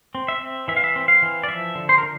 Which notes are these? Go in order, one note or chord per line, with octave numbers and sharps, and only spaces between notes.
C4
E5
C4
E3 E5
F5
E5
C4
F5
E3
D5
F3 E5
D3
C5
A#4
D3